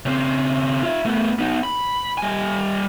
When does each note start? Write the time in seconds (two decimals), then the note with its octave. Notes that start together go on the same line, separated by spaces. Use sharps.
0.06 C#3 C4
0.83 F4 E5
1.05 A3 B3
1.39 B3 D#4
1.64 B5
2.18 G3 G#5